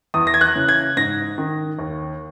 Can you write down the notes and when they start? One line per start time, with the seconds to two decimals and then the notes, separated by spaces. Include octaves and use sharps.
0.14 E2 D#6
0.27 A#6
0.34 G#6
0.41 F#6
0.55 C#3 E3
0.69 G#6
0.96 G#2 A#6
1.38 D#3
1.79 D#2